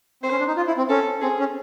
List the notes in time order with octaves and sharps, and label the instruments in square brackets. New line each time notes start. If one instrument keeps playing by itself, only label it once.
[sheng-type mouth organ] C4 [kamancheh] C5
[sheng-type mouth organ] C#4
D4
D#4
F4
E4
C4
[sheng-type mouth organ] C#4 [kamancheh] A4
[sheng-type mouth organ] C4 [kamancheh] G#4
[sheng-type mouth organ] C#4